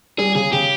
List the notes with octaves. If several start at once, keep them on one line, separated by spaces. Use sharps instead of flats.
G3 G#4
C#3 G#4
C#3 G4